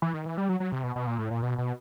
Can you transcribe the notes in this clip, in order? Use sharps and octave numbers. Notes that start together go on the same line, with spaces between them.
E3
D#3
E3
G3
F#3
F#3
C3
B2
B2
A#2
A2
A#2
B2
B2